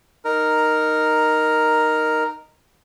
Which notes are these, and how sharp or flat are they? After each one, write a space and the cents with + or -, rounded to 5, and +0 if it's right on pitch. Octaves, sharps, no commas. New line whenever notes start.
D#4 -5 A#4 +0